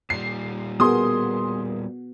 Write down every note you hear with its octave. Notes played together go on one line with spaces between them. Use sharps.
A#2 G3 C7
B3 F#4 G#4 A#4 C6 D#6